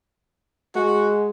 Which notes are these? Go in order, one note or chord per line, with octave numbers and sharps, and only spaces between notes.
G#3 F#4